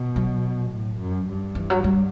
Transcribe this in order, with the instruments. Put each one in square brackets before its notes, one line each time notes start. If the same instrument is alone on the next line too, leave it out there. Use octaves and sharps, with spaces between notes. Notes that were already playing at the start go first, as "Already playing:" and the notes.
Already playing: [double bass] B2
[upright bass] F#3
[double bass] A2
F#2
G2
[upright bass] E3
F#3
G3